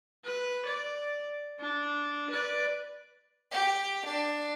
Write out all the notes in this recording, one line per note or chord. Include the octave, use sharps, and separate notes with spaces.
B4
D5
D4
B4 D5
G4
D4